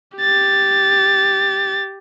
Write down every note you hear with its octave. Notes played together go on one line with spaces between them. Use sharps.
G4 A6